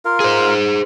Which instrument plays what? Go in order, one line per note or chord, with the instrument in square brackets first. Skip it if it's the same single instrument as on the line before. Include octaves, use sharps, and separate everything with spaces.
[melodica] F4 A#4 F5
[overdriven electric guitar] G#4 C5